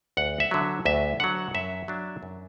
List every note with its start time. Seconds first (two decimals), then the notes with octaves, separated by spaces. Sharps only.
0.17 D2 F#5
0.40 E5
0.51 D3 F#3
0.85 D2 E5
1.20 D3 F#3 F#5
1.54 F#2 E5
1.88 F#3 D4
2.23 F#2